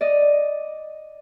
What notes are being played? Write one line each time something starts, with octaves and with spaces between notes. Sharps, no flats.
D5 D#5